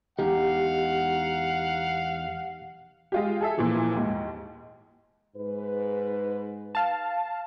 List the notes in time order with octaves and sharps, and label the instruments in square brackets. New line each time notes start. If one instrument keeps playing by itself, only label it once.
[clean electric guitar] E2 G#3 D#4 [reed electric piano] G4 [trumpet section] F5 F#5
[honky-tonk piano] G#3 F4 G4
G#4 A4 E5
A#2 E3 F3
D#2 G#2
[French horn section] G#2 B4
[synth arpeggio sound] F5 A5